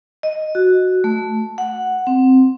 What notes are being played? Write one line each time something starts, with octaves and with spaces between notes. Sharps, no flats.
D#5
F#4
A3
F#5
C4